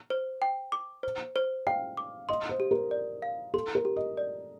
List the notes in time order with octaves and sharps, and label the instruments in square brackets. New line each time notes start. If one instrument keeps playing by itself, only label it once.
[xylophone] C5
G5
D6
C5
C5
[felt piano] F5 [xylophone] G5
[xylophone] D6
[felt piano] D#5 [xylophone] C6
[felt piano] C5
[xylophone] G4
[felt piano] A#4
[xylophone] D5
F5
[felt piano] A4 [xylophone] C6
[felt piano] A#4
[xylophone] G4
[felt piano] D#5
[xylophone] D5